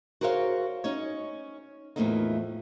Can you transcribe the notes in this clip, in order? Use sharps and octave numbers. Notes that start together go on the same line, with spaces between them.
F#4 G#4 A#4 C5 C#5 F5
C#4 D#4 C#5
E2 A2 F3 A3 A#3 D#4